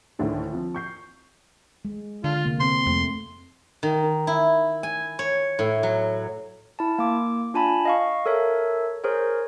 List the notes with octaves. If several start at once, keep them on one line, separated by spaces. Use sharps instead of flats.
D2 A2 D3 D#3
F3 C4
C#6 G6 C7
G#3
D3 F4
C3 A#3
C3 C4 C6
F2 A3
D#3
E4
G#5
C#5
A2
F#3
E4 A5
A#3 D6
D4 F4 G#5 A5 B5
D#5 F5 C#6
A4 A#4 C#5 E5
G#4 A#4 C5 C#5